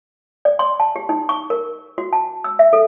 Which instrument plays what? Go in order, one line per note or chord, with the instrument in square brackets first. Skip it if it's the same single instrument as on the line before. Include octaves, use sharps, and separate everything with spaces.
[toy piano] D5
C6
A5
G4
D#4
C#6
A#4
F#4
A5
E6
E5
A4